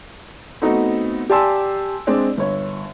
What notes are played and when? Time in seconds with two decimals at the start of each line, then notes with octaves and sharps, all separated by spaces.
0.62 A3 B3 C4 D#4 F#4
1.30 G4 D5 G#5 A5 C6 E6
2.07 G#3 C4 D4 D5
2.37 G1 C#5